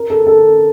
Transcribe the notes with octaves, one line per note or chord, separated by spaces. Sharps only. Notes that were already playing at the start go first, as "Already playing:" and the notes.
Already playing: A#4
A4
A4